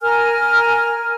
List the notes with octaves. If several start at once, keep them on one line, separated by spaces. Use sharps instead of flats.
A#4 G#5 F6